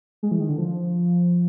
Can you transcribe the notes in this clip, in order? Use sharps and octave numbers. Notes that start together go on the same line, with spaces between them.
G#3
E3
D#3
D3
F3